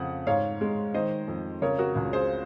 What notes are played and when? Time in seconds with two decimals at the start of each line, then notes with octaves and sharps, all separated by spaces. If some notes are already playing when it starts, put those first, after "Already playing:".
Already playing: F2 C#3 F#5
0.27 G#2 C#5 F5
0.61 G#3
0.94 D#3 C5 D#5
1.28 F2
1.62 C#3 A#4 C#5
1.78 F#4 A#4
1.95 C#2
2.13 G#4 C5